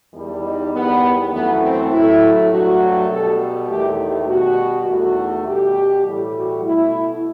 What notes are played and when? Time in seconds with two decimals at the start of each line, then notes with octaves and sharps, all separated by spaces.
0.12 E2 D#3 G3
0.42 D#4
0.72 E2 D#3 G3 B3
1.31 F#2 E3 A3 B3
1.61 C4
1.90 A2 F#3 A3 E4
2.49 G2 F#3 A3 F#4
3.08 B2 G3 A4
3.67 E2 D#3 A3 G4
3.97 G4
4.26 B2 G3 F#4
4.86 E2 D#3 A3 F#4
5.45 B2 G3 G4
6.05 A2 E3 G3
6.34 F#4
6.63 B2 A3 E4